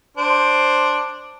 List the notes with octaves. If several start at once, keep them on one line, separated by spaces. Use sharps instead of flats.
D4 C5